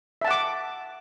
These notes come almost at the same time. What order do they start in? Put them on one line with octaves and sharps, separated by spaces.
E5 A5 F#5 D6